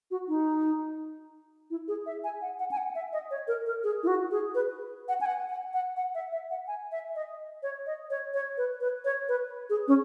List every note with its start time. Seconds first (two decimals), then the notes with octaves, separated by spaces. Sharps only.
0.11 F#4
0.28 D#4
1.70 E4
1.88 G#4
2.06 E5
2.24 G#5
2.42 F#5
2.59 F#5
2.71 G#5
2.77 F#5
2.95 E5
3.13 D#5
3.31 C#5
3.48 A#4
3.66 A#4
3.84 G#4
4.03 E4
4.07 F#4
4.31 G#4
4.55 B4
5.08 F#5
5.21 G#5
5.26 F#5
5.49 F#5
5.73 F#5
5.97 F#5
6.15 E5
6.32 E5
6.50 F#5
6.67 G#5
6.92 E5
7.15 D#5
7.63 C#5
7.86 D#5
8.10 C#5
8.34 C#5
8.57 B4
8.80 B4
9.05 C#5
9.28 B4
9.70 G#4
9.88 C#4